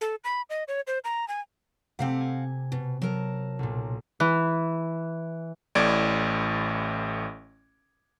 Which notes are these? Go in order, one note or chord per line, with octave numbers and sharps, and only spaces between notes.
A4
B5
D#5
C#5
C5
A#5
G#5
C3 A3 C4 G4 F5 F#5
G#5
B2
F#3 A#4 A5
B1 A#2
E3
A1 A2 D5 G#6 D7